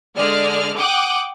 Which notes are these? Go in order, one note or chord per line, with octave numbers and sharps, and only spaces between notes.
D3 G#3 D5 F6
F#5 G5 D6 D#6 F#6